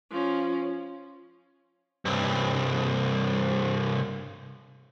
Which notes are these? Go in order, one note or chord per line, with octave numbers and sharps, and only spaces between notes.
F3 C#4
C2 G2